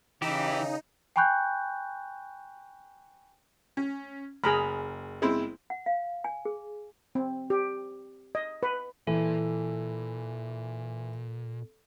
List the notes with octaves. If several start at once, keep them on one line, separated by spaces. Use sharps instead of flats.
C#3 E3 D#4 G4
G5 G#5 B5 C#6 F#6 G6
C#4
F#1 G#4 A#5 B5 F6
G#3 C4 E4
F#5
F5
G#5
G#4
C4
G4
D#5
B4
A#2 E3 A4